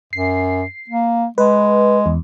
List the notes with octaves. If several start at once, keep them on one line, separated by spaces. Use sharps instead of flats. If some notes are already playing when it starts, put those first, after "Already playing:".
F#2 C7
A#3
G#3 B4
E2